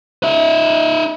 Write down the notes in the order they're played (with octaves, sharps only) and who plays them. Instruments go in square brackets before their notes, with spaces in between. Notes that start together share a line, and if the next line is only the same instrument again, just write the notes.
[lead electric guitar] D#4 E5